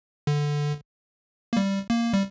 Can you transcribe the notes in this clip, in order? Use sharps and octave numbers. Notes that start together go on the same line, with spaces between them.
D3
A#3
G3
A#3
G3